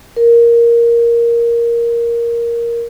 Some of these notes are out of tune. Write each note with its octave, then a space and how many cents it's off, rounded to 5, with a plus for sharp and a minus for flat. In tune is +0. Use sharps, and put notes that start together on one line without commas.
A#4 +5